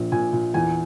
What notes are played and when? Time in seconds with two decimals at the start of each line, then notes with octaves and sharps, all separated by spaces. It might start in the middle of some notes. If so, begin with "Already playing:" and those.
Already playing: A#1 A#2
0.12 A#2 G#5
0.33 A#2
0.54 E2 G#5